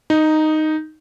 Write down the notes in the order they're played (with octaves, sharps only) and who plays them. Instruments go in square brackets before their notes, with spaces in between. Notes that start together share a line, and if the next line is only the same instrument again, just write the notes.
[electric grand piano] D#4